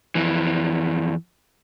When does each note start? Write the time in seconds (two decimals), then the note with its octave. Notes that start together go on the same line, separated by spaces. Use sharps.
0.15 F2 E3